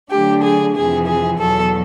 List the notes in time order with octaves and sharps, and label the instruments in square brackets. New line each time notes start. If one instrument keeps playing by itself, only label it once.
[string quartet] D3 F#3 A3 D4 G4
G#4
F2 C3 E3 G#4
G#4
E2 B2 F#3 A4